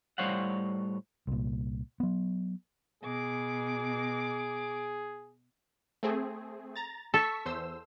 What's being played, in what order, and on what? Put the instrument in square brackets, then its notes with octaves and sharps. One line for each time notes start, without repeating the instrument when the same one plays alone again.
[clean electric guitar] A2 G3 C5 C#5 F5 F#5
[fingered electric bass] C2 A#2
F#3 B3
[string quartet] B2 D6 [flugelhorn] G#4
[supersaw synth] A3 C4 G#4
A#5 A6
[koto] A4 [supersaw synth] C#6 E6 B6
[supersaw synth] E2 C5 E6